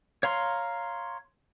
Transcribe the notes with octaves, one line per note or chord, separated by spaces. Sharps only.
C#5 F5 A#5 C6